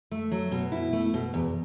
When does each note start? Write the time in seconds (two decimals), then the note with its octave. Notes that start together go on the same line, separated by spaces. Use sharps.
0.11 A3
0.32 F#3
0.52 B2
0.72 E4
0.93 A3
1.14 B2
1.34 E2